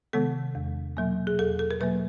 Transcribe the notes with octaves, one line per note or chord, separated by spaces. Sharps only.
C3 D#3 G#3 B3 A4
E2
B2 F#3 A#3
G#4
E2 A4
A4
A#4
B2 F#3 A#3 B4